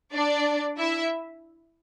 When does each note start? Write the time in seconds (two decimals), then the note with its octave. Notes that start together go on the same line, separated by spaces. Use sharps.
0.12 D4 D5
0.78 E4 E5